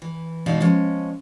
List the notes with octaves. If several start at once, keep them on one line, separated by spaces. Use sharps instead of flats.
E3
E2 B2 E3 G#3 D#4 F5
F3 G#3 C#4